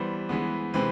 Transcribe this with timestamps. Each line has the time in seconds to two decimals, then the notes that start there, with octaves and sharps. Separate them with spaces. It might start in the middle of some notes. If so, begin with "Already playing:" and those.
Already playing: E3 G3 B3 C5
0.29 E3 G#3 B3
0.74 C3 E3 G#3 C4 B4